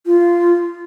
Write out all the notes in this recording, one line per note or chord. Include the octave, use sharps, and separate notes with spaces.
F4